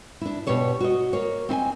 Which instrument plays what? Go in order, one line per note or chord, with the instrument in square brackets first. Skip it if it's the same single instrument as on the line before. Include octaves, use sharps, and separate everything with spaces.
[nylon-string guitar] D4 E4
B2 B3 G4 C#5 D5
F#4 D#5
A#3 C#5
C4 E4 D#5 G#5